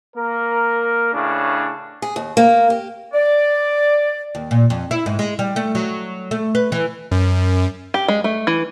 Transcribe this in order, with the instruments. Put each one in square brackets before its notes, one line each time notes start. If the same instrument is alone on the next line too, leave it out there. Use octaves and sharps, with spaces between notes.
[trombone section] A#3 A#4
A2 C#3 D4
[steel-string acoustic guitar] G#4
D#2
A#3
G4
[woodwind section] D5
[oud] D#2
A#2
F2
E4
G#2
G#3
G3
A3
F#3
A3
B4
E3
[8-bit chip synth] F#2
[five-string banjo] G4
G#3
A3
E3